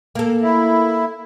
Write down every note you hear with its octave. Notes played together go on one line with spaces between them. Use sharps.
A#3 A4
E4